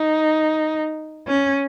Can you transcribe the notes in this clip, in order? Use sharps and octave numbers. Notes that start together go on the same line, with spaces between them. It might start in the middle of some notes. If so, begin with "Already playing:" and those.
Already playing: D#4
C#4